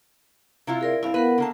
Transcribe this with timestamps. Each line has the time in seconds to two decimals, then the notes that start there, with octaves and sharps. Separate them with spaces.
0.67 C3 E4 F4
0.81 G#4 A#4 D5
1.03 G2 C4 E4 F5
1.14 B3 A#4 B4 F#5
1.38 D3 A#3 A5